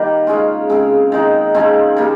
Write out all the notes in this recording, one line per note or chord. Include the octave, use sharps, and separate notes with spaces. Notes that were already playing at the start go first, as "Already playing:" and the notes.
Already playing: D#3 G3 A#3
C#3 G#3 C#4 F4
C#3 G#3 C4
D#3 G#3 D#4
C#3 F3 G#3 C4
C#3 G3 A#3